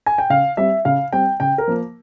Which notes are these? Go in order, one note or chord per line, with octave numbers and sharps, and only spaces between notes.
G#5
G5
C#3 F5
G3 C4 E5
C#3 F5
G3 C4 G5
C#3 G5
A#4
F3 A#3